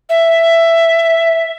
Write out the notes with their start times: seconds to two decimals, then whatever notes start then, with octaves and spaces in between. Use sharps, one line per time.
0.09 E5